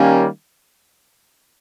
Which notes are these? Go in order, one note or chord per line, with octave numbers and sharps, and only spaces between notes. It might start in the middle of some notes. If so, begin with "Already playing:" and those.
Already playing: D#3 G3 A#3 C#4